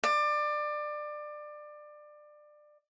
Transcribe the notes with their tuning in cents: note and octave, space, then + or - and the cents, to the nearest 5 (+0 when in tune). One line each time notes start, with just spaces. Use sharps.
D5 +25